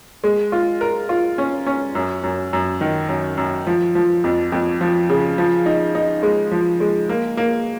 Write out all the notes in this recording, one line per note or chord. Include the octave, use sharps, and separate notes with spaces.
G#3
F4
A#4
F4
C#4
C#4
F#2
F#2
F#2
D#3
F#2
F#2
F3
F3
F2
F2
F3
C#3
F3
D#4
D#4
G#3
F3
G#3
A#3
A#3